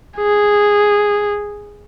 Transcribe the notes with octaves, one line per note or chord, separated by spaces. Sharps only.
G#4